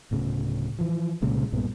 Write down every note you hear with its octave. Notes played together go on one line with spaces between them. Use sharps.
D1 A2 C#3
E3 F3
C2 A#2 C#3 G#3
B1 G2 A#2 B3